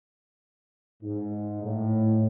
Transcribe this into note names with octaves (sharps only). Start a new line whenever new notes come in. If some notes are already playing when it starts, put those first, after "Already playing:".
G#2
A2